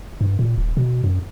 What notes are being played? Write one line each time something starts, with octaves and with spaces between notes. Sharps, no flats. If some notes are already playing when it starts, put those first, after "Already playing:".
G2
A#2
D#1
B2
F#2